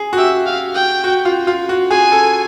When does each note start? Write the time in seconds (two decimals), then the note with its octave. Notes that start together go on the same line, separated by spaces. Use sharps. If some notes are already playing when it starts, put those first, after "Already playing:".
Already playing: G#4
0.13 F#4
0.17 G4 E5
0.46 F5
0.75 G5
1.04 F#4
1.25 F4
1.47 F4
1.69 F#4
1.91 G#4 G#5
2.12 A4